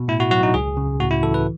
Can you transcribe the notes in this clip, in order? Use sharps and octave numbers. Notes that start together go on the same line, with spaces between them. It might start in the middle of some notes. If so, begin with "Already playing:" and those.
Already playing: B2
A2 E4
F#4
F#3 F#4
D#4
C#2 G#4
C#3
A2 F#4
E4
E3 A4
B4